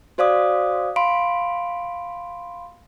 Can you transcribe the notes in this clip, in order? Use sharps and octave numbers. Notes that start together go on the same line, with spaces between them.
F#4 C5 D5 F5 D6 D#6
F5 B5 C6 D7